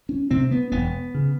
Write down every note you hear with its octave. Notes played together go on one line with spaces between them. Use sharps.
C#4
C3 C4
B3
E1 B3
C#3